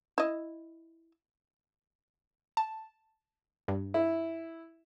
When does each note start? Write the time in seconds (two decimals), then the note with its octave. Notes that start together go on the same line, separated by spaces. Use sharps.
0.18 E4 D#5
2.57 A5
3.68 G2
3.94 E4